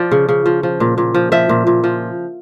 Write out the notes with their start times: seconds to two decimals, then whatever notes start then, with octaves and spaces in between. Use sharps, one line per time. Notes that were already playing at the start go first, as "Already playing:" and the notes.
Already playing: F3 D5
0.11 C#3
0.29 C#3
0.46 F3
0.63 F3
0.80 A#2
0.98 A#2
1.14 F3
1.32 F3 E5
1.49 A#2
1.67 A#2
1.84 F3